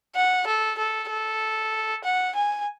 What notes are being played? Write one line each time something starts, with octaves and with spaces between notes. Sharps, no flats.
F#5
A4
A4
A4
F#5
G#5